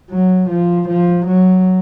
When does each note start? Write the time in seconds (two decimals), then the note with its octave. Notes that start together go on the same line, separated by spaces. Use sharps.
0.10 F#3
0.50 F3
0.89 F3
1.27 F#3